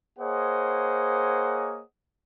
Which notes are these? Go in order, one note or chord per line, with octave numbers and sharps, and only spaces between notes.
A#3 G#4 C5 C#5 D#5 F#5